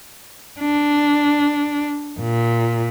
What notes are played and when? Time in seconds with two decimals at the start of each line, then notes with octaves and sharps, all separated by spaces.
0.60 D4
2.20 A#2